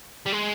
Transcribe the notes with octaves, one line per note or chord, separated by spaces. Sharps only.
G3
G#3